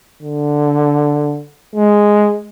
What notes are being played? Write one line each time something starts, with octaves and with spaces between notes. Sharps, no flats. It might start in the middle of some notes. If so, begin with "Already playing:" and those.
D3
G#3